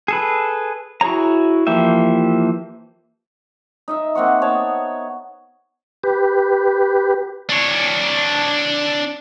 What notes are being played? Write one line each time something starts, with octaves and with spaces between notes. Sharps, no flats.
G#4 A4 B4
E4 F#4 G#4 C#5 A#5
E3 F3 A#3 G4 E5
D#4 D#5 E5
A#3 C4 F#5 C#6
B3 C#5 A5
G4 B4
D4 C#5